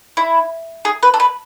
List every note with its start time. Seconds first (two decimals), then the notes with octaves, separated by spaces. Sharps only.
0.17 E4
0.85 G#4
1.03 B4
1.14 A4
1.20 B4